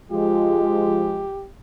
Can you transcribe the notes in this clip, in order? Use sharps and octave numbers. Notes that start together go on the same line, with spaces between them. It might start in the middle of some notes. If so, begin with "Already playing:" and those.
F3 G#3 F4 G4